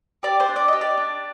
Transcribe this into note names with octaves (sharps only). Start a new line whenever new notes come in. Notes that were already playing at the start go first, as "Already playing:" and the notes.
G4 D5
C5
D4
D5
G4 D#5
D5
D4